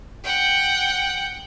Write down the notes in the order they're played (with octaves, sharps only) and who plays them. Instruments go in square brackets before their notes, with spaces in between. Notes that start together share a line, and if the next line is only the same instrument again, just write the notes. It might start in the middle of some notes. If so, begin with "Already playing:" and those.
[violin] F#5 G5